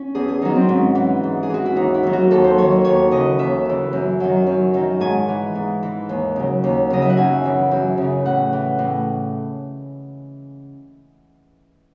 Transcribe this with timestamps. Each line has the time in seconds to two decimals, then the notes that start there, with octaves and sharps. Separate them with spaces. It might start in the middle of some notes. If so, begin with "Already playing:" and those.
Already playing: C#4
0.15 E2 G#4
0.28 G#4
0.42 D#3 F#3 D#4
0.55 C4
0.69 G#2 C#4
0.95 E3
1.23 G#2
1.43 G#4
1.50 E3 F#4
1.65 E4
1.76 D#2 D#4
1.94 E4
2.03 D#3 F#3
2.13 F#4
2.31 D#2 A4
2.44 C5
2.58 D#3 F#3 C#5
2.72 C#5
2.85 D#2 C#5
3.11 C#3 E3 D#5
3.39 D#2 E5
3.65 C#3 E3
3.93 F#2
4.20 D#3 F#3
4.46 F#2
4.74 D#3 F#3
5.00 G#2 G#5
5.28 E3
5.55 G#2
5.83 E3
6.09 D#2
6.36 C#3 F#3
6.64 D#2
6.90 C#3 F#3 D#5
7.02 E5
7.09 F#5
7.17 F#2 G#5
7.44 C#3 E3
7.71 F#2
7.98 C#3 E3
8.25 A2 F#5
8.53 E3
8.79 A2